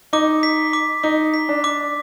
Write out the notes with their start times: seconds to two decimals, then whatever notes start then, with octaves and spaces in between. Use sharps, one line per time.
0.13 D#4 D6
0.43 B6
0.73 D6
1.03 D#4 D6
1.34 B6
1.49 D4
1.64 D6